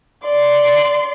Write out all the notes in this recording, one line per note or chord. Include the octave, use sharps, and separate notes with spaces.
D5 C6